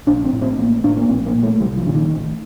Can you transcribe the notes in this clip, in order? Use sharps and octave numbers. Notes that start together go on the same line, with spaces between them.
A#1 D4
C4
A2
C4
A1 A#3
A2 D4
A#3
A#1 C4
A#3
A#2
A3
C2 G3
F3
A#2 D3
D#3
A1